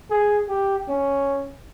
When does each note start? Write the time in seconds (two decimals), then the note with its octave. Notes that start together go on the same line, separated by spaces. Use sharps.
0.10 G#4
0.49 G4
0.89 C#4